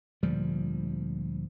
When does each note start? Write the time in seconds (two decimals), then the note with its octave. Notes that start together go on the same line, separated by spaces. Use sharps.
0.23 D2 A#2 F3 G3